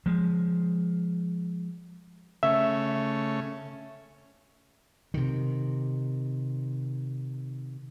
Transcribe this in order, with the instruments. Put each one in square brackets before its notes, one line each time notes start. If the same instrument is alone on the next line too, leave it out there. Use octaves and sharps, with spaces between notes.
[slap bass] F3 G#3
[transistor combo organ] C#3 A3 C#4 [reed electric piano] E5
[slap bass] C3 D#3